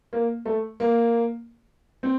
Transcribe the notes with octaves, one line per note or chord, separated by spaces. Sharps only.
A#3
A3
A#3
C4